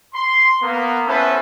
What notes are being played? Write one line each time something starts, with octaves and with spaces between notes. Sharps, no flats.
C6
A#3 B3
B3 C#4 E4 A4 B4 C5